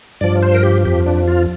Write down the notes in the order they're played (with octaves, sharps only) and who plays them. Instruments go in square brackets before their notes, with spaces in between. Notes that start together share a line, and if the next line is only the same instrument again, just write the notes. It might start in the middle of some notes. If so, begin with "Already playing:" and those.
[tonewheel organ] G2 F3 D5
C5
A#4
G4
F2 F3 G4
D4
F4